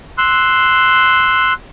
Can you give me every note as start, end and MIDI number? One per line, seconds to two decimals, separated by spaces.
0.18 1.53 84
0.18 1.53 88
0.18 1.53 90